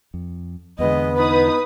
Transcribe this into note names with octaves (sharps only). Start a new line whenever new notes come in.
F2
E2 D3 G#3 B3 D#5
D#4 B4 D#6